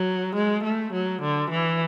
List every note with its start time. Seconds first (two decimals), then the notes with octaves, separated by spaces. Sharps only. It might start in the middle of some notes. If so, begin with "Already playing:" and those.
Already playing: F#3
0.35 G#3
0.63 A3
0.93 F#3
1.22 D3
1.50 E3